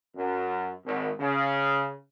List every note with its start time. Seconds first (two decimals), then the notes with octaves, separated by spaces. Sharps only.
0.15 F#2
0.85 G#1
1.19 C#3